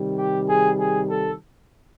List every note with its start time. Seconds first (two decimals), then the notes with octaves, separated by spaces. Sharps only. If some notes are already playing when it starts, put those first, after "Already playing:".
Already playing: C3 D#3 G3
0.18 G4
0.48 G#4
0.79 G#4
1.10 A4